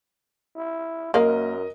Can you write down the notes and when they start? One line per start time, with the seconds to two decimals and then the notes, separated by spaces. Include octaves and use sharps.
0.57 E4
1.14 F#2 A#3 A#4 D#5 F5